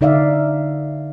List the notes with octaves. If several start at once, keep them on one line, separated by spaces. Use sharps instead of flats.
D3 D#4 D5 E5 F5